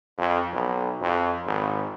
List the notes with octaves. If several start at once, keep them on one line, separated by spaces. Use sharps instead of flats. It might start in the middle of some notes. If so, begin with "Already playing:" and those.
F2
B1
F2
G#1